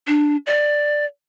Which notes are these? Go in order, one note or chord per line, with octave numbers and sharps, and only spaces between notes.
D4
D5